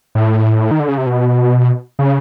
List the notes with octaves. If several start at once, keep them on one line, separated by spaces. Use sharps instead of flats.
A2
D#3
D3
C#3
C3
B2
C#3